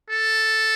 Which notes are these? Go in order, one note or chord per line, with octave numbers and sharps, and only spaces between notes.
A4